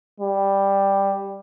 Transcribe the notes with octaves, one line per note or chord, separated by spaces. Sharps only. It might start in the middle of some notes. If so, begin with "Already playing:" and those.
G3